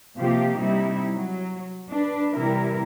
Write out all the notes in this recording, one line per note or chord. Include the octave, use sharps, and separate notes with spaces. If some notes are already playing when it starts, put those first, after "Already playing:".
C3 F3 A#3 F4 G4
C3 G3 D#4 E4
F#3
D4 B4
C3 E3 G3 E4 A#4